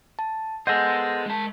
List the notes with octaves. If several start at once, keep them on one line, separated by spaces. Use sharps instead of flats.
A5
B3 G#4 A4 C5 D#5 F#5 G6 A#6
G#3 A5